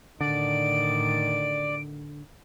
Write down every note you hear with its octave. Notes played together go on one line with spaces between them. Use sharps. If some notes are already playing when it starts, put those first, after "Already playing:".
A2 D3 D#3 D5 D7